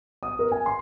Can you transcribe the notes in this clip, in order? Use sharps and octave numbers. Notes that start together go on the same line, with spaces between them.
D#6
A#4
G#5
C6